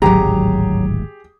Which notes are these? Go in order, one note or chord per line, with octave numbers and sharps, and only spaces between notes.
D1 G#1 F#3 G4 G#4 A#5